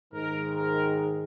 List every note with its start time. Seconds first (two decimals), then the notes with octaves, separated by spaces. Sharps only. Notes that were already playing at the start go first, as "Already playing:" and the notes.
0.13 G#2 D#3 G#3 A#4
0.55 A#4